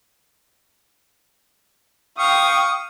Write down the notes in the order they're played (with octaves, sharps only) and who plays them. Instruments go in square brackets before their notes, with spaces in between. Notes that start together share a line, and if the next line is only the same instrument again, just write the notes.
[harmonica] F5 C#6 [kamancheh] G5 D#6